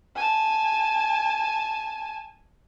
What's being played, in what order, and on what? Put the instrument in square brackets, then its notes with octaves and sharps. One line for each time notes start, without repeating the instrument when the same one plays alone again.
[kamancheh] G#5 A5